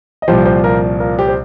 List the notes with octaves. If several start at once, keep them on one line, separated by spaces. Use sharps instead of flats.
D#5
C2 A#2 F3 G4 C5
G4 C5
F4 A#4
F4 A#4
G4 C5
C5